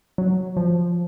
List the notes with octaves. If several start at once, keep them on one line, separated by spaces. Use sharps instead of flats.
F#3
F3